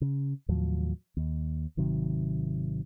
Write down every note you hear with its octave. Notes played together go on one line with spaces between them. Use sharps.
C#3
D#2 A2 F3 F#3
D#2
G#1 C3 D#3 F#3